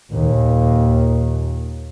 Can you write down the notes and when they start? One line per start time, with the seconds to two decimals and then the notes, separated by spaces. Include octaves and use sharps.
0.13 D#2 A#2